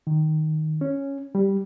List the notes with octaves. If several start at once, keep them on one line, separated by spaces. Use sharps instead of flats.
D#3
C#4
G3